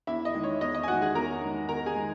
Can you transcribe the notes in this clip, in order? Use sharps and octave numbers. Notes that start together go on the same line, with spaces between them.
E2 E4 E5
D#5
D#3 G#3
C#5
E2 D#5
D#5
G#5
D#3 G#3 F#4 F#5
G#4 G#5
E2 A#4 A#5
D#3 G#3
E2 A#4 A#5
G#4 G#5
D#3 G#3